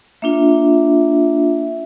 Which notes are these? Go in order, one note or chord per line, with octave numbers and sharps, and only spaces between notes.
A#3 D4 F4 E5